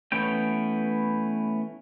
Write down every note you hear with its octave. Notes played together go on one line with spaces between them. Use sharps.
E3 A3 B3 C#4 G5